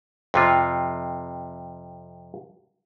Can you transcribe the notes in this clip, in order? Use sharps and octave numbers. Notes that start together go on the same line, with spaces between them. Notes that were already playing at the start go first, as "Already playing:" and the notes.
F2 C3 F4